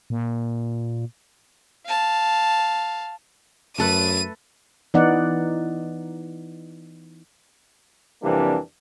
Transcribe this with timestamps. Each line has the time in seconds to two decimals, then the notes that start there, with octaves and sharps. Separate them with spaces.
0.10 A#2
1.86 F5 A5
3.78 F#2 A3 A4 B4 D#7
4.94 E3 B3 D#4 D5 F#5
8.22 F2 C3 E3 G3 A#3 D4